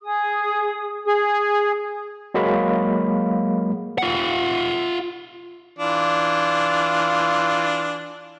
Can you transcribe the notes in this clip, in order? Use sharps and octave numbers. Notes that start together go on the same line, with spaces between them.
G#4 D#6
G#4
F#3 G#3 A#3 F#4 F5 B5
F4 F#5
E3 D4 F4